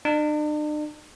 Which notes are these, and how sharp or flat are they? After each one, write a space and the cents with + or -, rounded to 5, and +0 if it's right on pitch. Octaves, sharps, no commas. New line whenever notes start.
D4 +45